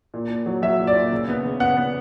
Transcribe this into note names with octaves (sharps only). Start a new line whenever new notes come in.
A#2
A#2
F#3
F#3 E5
A#2
D5
A#2
C#3
B3
C#3
B3 F#5
B3